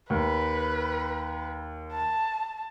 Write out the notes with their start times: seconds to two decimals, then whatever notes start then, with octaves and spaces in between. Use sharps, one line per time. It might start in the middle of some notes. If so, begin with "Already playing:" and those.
0.10 D#2 B4
1.92 A5